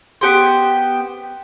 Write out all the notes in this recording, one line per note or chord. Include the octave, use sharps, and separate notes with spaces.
B3 G4 C5